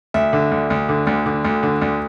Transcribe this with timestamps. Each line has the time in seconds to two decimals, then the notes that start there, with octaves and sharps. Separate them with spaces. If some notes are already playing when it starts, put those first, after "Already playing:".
0.14 D2 E5
0.33 D3
0.51 D2
0.70 D2
0.89 D3
1.07 D2
1.26 D3
1.45 D2
1.63 D3
1.82 D2